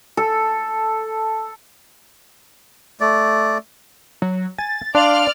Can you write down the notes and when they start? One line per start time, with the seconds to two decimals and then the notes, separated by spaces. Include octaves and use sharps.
0.17 A4
3.00 A3 D5
4.22 F#3
4.58 G#5 A6
4.95 D4 D5 F5 C6 F6